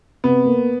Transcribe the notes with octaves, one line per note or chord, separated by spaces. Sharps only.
C3 B3
A#3